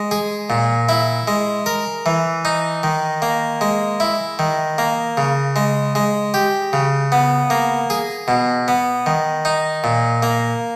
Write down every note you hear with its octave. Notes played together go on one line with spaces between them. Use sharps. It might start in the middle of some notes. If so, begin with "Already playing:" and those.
Already playing: G#3
G#4
A#2
E4
G#3
A#4
E3
D#4
D#3
A#3
G#3
E4
D#3
A#3
C#3
G#3
G#3
G4
C#3
B3
A#3
G#4
B2
B3
D#3
D#4
A#2
A#3